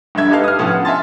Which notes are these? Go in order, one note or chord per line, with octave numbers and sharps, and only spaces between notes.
G1 G2 D3 E5 G#6
D#4 G4 A4 B4 F5
D#6 F6
A2 F3 B3 C#4
F#5
E5 F5 G#5 A5 C6 A6